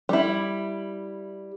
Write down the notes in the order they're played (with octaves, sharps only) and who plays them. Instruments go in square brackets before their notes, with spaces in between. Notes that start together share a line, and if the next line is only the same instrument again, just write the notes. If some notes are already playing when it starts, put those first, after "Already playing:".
[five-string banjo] G3 E4